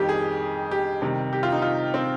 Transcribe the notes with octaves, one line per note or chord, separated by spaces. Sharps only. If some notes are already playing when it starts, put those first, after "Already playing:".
Already playing: F2 D#3 G3 G4
G#4
G4
C3 D#3 G3
G4
F4
D#4
F4
C4